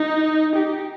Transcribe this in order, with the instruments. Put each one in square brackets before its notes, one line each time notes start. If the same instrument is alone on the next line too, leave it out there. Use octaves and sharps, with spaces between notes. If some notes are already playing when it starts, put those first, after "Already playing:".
Already playing: [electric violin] D#4
G4